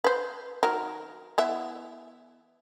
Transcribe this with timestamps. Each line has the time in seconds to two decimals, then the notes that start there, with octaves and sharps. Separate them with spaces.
0.04 B4 C5
0.63 D#3 F#3 A#4
1.38 E3 B3 E5